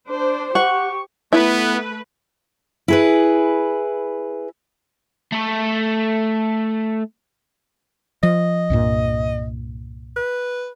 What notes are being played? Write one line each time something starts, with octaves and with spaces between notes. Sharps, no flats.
D4 C5
G4 F#5 C#6
A3 B3 E4 B4
E4 G#4 B4
A3 A4
F3 D#5
C2 G2 A#2
B4